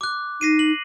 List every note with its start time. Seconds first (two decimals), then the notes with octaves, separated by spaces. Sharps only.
0.01 D6 F#6
0.41 D#4 A#6 C7 D#7
0.59 F#7